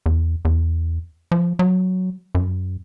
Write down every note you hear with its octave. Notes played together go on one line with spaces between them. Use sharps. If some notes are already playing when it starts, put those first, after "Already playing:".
E2
E2
F3
F#3
F#2